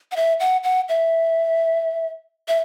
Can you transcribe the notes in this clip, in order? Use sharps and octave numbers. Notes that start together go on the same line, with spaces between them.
F#5
E5
F#5
F#5
E5
E5